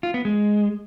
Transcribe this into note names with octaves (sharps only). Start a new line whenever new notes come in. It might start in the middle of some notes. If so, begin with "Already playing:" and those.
F4
B3
G#3